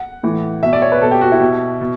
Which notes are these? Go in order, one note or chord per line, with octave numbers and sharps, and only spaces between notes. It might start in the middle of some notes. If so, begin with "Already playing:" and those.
Already playing: F#5
A2 E3
B2 E5
D5
C#5
B4
B2 A4
G4
F#4
E4
B2
B2